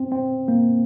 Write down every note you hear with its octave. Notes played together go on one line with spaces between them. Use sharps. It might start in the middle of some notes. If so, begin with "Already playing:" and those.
Already playing: C4
C4
A#3